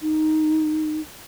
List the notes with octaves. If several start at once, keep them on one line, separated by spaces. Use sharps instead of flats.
D#4